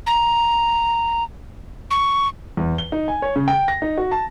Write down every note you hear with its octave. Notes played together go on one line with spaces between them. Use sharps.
A#5
C#6
E2
G7
D#4
G#5
C#5
C#3
G5
A#6
D#4
F#4
A5